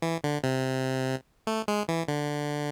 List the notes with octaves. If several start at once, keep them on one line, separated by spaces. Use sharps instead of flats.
E3
D3
C3
A3
G#3
E3
D3